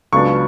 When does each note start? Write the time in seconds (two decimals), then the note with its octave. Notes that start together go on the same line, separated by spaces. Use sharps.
0.12 C#2 C#3 F#3 B3 D4 C#6